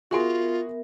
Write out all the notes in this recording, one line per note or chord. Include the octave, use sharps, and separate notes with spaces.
B3 F4 F#4 G#4 A#4 E5 C6